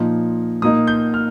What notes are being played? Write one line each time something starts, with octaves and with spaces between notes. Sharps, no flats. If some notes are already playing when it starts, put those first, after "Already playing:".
Already playing: A#2 F3 D#4
A#2 A#3 D#4 D#6
G6
F6